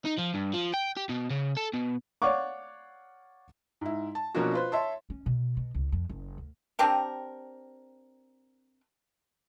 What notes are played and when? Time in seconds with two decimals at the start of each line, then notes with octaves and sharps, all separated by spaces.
0.05 D#4
0.18 F3
0.34 G2
0.53 F3
0.74 G5
0.97 G4
1.09 B2
1.31 C#3
1.57 A4
1.74 B2
2.22 C#5 D5 F5 F#5 C#6 D6
3.81 G#2 E4
4.15 A5
4.35 B2 F3 A#3 C#4 D4 F#4
4.54 F4 B4 C5
4.72 C#5 E5 A5 C6
5.10 C#4
5.26 B2
5.57 B2
5.75 C#2
5.92 F2
6.09 F#1
6.38 D2
6.79 C4 D4 G4 A#4